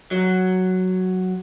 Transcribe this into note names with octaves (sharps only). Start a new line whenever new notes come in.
F#3